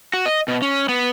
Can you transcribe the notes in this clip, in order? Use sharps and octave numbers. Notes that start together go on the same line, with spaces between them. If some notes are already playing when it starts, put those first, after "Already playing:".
F#4
D#5
B2
C#4
B3